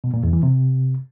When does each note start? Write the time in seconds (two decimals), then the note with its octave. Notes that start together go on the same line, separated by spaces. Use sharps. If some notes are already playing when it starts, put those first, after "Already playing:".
0.04 B2
0.14 A#2
0.23 E2
0.33 E3
0.43 C3